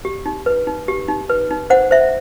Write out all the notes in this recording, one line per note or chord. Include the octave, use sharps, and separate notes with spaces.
G4
D#4
B4
D#4
G4
D#4
B4
D#4
C5 F#5
C5 E5